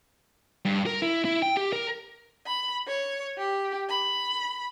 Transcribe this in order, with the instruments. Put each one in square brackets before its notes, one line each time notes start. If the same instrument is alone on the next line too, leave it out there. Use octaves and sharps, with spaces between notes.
[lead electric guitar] G2
A#4
E4
E4
G5
G4
A#4
[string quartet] B5
C#5
G4
B5